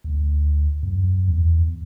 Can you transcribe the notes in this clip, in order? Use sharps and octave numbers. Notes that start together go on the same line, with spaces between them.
D2
F#2
E2